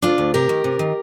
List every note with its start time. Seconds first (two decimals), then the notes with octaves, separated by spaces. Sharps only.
0.02 D2 D4 F4
0.18 D2
0.34 C3 G4 A#4
0.49 D#3
0.64 C3
0.79 D#3